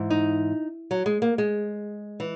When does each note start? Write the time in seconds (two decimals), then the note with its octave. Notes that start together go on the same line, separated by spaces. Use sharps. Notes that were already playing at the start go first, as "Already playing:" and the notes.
Already playing: G#2 E3
0.10 D#4
0.91 F#3
1.06 G#3
1.22 A#3
1.38 G#3
2.20 E3